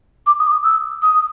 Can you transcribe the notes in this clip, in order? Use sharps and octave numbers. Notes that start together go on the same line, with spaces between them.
D6
D#6
D6
D#6
E6
D#6